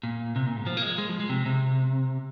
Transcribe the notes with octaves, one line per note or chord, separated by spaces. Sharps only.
A#2
C3
A#2
G#2
F3
A#3
G#3
G#3
F3
G#3
C3
C3